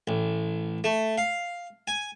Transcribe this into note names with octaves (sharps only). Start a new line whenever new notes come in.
A1
A3
F5
G#5